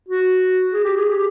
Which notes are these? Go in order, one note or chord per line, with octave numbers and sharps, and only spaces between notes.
F#4
G#4
G4
G#4
G4